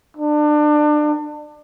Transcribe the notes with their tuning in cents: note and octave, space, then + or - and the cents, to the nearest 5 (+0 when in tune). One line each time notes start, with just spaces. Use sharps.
D4 +30